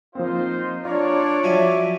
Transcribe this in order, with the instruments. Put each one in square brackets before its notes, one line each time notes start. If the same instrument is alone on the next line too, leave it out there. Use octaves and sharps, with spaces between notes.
[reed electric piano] F3 A#3 C4 [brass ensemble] D#4 F4 C5
[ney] D4 [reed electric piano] F4 A#5 F6 [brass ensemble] C#5 D5
[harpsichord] F3 F#3 G#5 [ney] E5